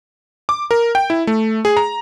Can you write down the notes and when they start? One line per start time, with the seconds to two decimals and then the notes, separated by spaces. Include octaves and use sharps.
0.49 D6
0.71 A#4
0.95 G5
1.10 E4
1.27 A3
1.65 G#4
1.77 A#5